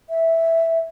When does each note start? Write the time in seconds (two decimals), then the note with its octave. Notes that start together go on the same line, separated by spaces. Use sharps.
0.09 E5